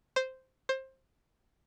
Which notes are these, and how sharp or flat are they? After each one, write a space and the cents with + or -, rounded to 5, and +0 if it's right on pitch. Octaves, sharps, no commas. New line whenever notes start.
C5 -5
C5 +20